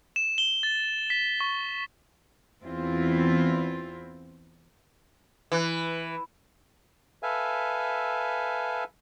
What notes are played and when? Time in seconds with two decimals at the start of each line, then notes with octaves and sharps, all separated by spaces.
0.16 E7
0.38 G7
0.63 A6
1.10 B6
1.40 C#6
2.65 E2 C4 E4 F4
5.52 E3
7.23 A4 B4 E5 F5 G#5